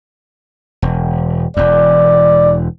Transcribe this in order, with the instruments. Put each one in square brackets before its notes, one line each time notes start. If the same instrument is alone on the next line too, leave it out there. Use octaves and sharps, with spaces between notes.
[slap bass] E1
[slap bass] E1 E2 [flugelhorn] D5